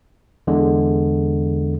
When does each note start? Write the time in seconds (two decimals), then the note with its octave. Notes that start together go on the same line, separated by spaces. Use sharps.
0.47 E2 D3 G#3